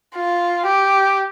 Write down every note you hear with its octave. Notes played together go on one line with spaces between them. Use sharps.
F4
G4